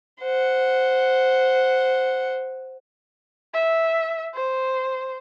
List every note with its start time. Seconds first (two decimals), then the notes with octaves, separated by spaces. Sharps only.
0.22 C5 F#5
3.54 E5
4.34 C5